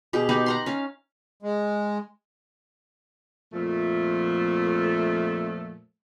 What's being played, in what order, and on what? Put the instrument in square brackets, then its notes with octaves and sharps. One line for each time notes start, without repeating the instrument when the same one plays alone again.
[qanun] B2 G4 G#4
B3 D#4 G4 B4
F#5 A#5 C6
C#4 F5
[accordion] G#3
[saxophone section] F2 A#2 F3 A3